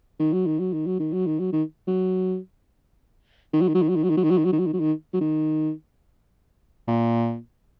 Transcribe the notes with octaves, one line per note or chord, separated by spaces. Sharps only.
D#3
F#3
D#3
F#3
D#3
F#3
D#3
F#3
D#3
F#3
D#3
F#3
D#3
F#3
D#3
F#3
D#3
F#3
D#3
F#3
D#3
F#3
D#3
F#3
D#3
F#3
D#3
F#3
D#3
F#3
D#3
F#3
D#3
A#2